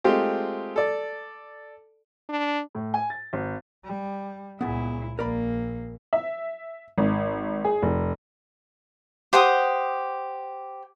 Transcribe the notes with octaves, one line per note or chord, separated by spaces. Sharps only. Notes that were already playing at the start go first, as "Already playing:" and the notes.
G#3 A3 C4 F4 G4
A4 D5
D4
A2
G#5
A6
G#1
G3
C#2 A#2 B3 E4 G#4
A#1 A#3 A#4 D5 B5
E5
G#1
G#4
F1
G4 C5 F#5 D#6